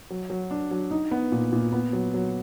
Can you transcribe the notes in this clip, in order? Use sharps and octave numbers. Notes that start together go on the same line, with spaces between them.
F#3
F#3
D4
F#3
D#4
B3
A#2
A#2
B3
F#3
F#3